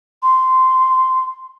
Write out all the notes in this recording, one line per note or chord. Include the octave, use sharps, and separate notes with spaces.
C6